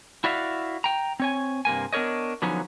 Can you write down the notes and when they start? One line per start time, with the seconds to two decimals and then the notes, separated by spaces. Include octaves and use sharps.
0.24 E4 F#4 D5 E5 F5
0.84 G5 A#5
1.20 C4 C#5 G#5
1.65 G2 C3 A#3 G#5
1.93 B3 D4 A#4 C#5 D#5
2.42 D3 F3 F#3 B3 C#4 D#4